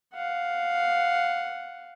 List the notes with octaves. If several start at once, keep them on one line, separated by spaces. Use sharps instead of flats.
F5 F#5